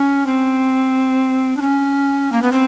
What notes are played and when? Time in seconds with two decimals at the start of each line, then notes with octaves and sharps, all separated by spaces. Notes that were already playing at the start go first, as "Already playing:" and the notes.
Already playing: C#4
0.27 C4
1.57 D4
1.62 C#4
2.32 A#3
2.42 B3
2.52 C4